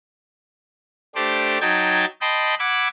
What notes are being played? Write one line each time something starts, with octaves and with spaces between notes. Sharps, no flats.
A3 D4 G4 C5 D5
F#3 D#4 G5 A5 G#6 A6
D#5 G5 A5 B5 C6
F#5 B5 D6 E6 G#6